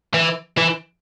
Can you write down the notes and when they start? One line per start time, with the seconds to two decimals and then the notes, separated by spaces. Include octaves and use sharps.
0.14 E3
0.58 E3